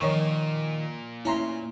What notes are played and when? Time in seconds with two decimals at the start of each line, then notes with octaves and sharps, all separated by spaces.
0.01 A#2 D#3 F3 C#5 C#6
1.25 C#4 E4 A#5 C6